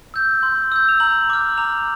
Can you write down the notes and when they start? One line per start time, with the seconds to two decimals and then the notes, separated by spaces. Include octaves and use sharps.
0.14 E6 G6
0.43 C6
0.72 E6 G6
0.89 F7
1.00 A#5 F#7
1.30 D6 F6
1.58 A#5 F7